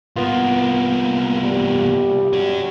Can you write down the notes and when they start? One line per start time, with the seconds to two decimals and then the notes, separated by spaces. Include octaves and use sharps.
0.16 C2 A#3 B3 F4
1.43 G3
2.33 C#4 F#4